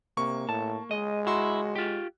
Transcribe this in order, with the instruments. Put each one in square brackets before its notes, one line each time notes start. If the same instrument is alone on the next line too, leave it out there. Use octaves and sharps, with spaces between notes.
[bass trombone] C3 [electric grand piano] A#3 C#6
[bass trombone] A2 [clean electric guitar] A5
[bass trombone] G#3 [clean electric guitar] D#5
[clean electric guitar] E4 [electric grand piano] F#4 C6
[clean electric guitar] F4 G4